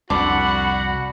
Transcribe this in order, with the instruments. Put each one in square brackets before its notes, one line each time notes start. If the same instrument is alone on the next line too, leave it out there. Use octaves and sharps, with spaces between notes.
[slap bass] C2 F2 [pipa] D3 D4 [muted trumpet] F#4 [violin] F#5 B5